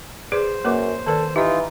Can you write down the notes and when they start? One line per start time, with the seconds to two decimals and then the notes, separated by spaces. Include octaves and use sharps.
0.32 G#4 B4 C5 D5
0.64 F#2 A#3 B4 D6
1.07 D#3 A4 B4 D5
1.36 E3 D#4 F4 G4 F5